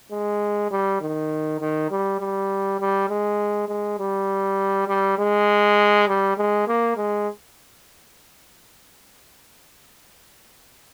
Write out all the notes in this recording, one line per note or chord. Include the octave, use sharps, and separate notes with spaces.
G#3
G3
D#3
D#3
G3
G3
G3
G#3
G#3
G3
G3
G#3
G3
G#3
A#3
G#3